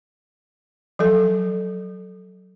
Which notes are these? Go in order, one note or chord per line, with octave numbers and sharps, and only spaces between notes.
F3 F#3 A4